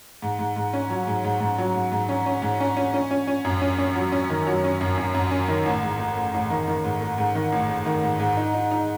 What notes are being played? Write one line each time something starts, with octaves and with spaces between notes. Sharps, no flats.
G#2
G#2
G#2
C#4
F#3
G#2
G#2
G#2
F#3
G#2
G#2
C#4
C#4
G#2
C#4
C#4
C#4
C#4
C#4
F#2
C#4
C#4
F#3
C#4
D#3
F#3
C#4
F#2
F#2
F#2
C#4
D#3
A1
G#2
A3
A3
A1
D#3
D#3
G#2
A3
G#2
D#3
A1
A3
D#3
G#2
G#2
D#4
D#4
D#4